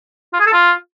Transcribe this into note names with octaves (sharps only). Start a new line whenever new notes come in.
F4
G#4
A4
F4